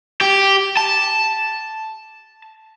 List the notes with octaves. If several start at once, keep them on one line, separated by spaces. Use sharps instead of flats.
G4
A5